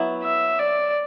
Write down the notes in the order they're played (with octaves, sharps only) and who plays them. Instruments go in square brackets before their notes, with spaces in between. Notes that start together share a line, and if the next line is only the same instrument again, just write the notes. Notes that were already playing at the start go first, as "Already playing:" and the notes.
Already playing: [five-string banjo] F#3 B3 E4
[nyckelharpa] E5
D5